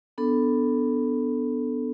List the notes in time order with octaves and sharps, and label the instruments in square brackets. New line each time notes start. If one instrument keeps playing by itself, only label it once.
[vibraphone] B3 D4 A4